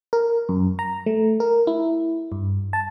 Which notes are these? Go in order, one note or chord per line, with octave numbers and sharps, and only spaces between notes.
A#4
F#2
A#5
A3
A#4
E4
G2
A5